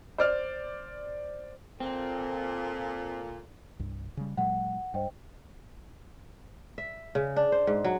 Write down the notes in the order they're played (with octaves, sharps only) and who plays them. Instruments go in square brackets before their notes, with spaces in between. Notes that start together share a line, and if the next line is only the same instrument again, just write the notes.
[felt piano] C5 D5 F6
[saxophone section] A#2 [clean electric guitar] C4 [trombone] A4
[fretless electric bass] C2 G2
C#3 G3
[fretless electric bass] A#2 F#3 G#3 [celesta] F#5
[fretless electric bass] G2 [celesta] C5 D#5 G5
[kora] E5
C#3
D4
C5
G#2
F#3